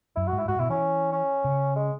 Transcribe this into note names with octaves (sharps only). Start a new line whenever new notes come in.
F#2 E4
F#4
G#2
E4
G#2 F#4
B2 E4
E3 C#4
C#4
C#3
G#3